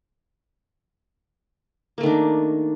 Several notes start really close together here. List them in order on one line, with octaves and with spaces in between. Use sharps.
A#3 A3 D#3 D4